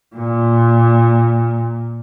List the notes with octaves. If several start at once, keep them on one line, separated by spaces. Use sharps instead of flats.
A#2